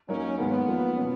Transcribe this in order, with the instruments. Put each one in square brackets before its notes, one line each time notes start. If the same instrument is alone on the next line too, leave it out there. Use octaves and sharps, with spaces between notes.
[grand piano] F#3 A#3 D#4 A#4 [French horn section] C#4
[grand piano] G#2 D#3 A#3 [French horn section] B3
[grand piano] F3 A#3 F4 B4
B2 F#3 C#4